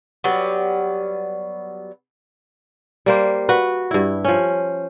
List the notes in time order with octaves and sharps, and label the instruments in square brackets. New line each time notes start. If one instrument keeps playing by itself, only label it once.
[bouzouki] F#3 G3 B3
[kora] G3 A#3 C5
F#4 B4
G2 E4
F3 C#4